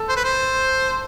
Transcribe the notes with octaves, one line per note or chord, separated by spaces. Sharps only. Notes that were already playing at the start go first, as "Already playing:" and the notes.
Already playing: A4
C5
B4
C5